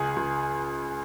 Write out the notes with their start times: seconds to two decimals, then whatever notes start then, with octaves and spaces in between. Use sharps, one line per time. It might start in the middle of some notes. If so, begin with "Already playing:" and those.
Already playing: C#2 G#4
0.16 C#2